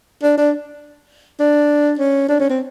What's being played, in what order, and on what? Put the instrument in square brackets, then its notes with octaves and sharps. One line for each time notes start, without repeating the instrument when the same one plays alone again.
[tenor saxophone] D4
D4
D4
C#4
D4
C#4
C4